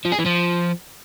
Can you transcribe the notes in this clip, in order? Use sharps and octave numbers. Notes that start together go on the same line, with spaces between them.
F3
G#4
E3
F3